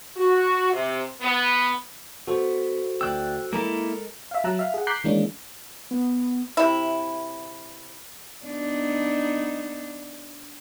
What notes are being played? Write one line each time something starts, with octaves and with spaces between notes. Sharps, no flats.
F#4
C3
B3
B3 F#4 A4 C5
D2 D5 G5 E6 F#6
G#3 A#3 E4 A4 A#4
E5 F5
F#3 E5 A5 A#5 E6 F#6
E5 F5 F6
G#4 F#5
A#5 D6 F#6 G6 B6 C7
D#3 E3 G#3 A#3 C#4 D4
B3
C3 E4
B3 D4 D#4